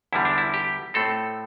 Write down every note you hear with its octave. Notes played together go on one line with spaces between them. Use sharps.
E2 D3 G3 E4
D4
E4
G4
A2 A3 C4 A4